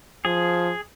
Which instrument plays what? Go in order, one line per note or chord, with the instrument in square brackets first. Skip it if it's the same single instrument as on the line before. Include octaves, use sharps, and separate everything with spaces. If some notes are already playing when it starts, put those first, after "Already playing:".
[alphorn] F3 [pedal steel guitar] G#4